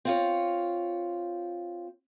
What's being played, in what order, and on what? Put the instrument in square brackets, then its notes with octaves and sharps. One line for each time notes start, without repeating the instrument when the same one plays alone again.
[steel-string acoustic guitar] C4 F4 C#5